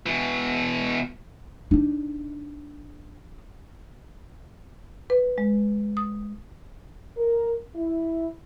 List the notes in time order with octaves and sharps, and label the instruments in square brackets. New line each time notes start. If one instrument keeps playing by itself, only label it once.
[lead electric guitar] B2 E3
[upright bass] D4 D#4
[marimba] B4
G#3
D#6
[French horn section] A#4
E4